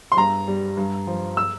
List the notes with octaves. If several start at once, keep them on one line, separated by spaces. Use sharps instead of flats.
C6
G2 A#5
G3
G2
F3
E6